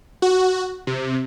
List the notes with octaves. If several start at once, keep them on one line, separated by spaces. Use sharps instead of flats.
F#4
C3